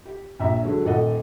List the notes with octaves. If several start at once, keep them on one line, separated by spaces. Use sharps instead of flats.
G4
A#1 E5 A#5
D3 F#3 G#3
D#1 A4 D#5 F#5